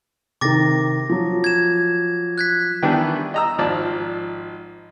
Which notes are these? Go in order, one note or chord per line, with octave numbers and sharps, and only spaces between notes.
C3 D#3 D6 A6 A#6
F3 F#3
G#6 E7
F#6 G#6 B6
D#3 E3 G3 B3 D4
D#5 A#5 E6
G#1 F3 D5 A5